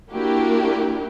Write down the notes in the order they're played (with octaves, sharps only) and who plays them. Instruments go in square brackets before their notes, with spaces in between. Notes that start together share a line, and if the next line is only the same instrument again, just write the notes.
[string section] A#3 D4 E4 F#4 G4 A#4